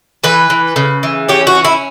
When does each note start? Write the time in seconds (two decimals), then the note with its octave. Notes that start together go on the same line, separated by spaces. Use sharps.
0.24 E3 B4
0.50 E3
0.76 C#3
1.03 E3
1.29 C#4 G4
1.47 F#4
1.55 C#4
1.65 E4